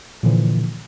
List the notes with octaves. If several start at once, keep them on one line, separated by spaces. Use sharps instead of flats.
A#2 D3 E3 F3